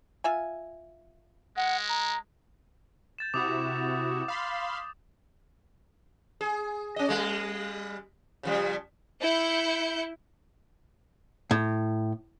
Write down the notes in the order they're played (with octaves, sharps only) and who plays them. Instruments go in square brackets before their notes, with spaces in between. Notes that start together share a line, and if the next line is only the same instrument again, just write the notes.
[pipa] F4 E5 G#5
[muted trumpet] G#3 [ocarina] F#5
[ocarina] A#5
[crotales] G6 A6 E7
[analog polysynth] C3 E4 F#4 [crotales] D6 D#6 A6
[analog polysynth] F5 B5 C6
[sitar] G#4
C#4 D#5
G3 G#3
C#3 F3 G3
[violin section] E4 G6 C#7
[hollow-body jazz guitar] A2